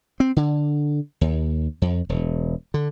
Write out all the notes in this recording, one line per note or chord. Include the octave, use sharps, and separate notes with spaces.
C4
D3
D#2
F2
E1
D3